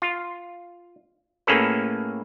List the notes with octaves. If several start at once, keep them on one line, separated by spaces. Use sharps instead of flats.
F4
A2 A#3 C#4 G#4 A4 B4